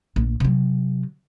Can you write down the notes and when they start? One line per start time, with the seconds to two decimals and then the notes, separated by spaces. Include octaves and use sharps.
0.16 A#1
0.40 C3 F#3